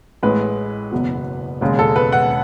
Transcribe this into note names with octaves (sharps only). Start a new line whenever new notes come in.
A1 A2 G#3 B4
F#1 E2 B2 F#3
E1 D#2 C#3 G#3
A4
B4
F#5